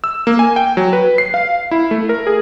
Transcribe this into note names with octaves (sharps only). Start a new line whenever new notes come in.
E6
A#3
G#5
G5
F#3
B4
C7
F5
E4
A3
A#4
G#4